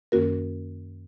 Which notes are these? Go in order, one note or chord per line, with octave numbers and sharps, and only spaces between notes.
F#2 D#3 A#3 C#4 F#4 A#4